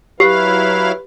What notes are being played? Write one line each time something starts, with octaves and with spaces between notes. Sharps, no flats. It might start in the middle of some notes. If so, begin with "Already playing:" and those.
F#3 E4 G4 B4 F5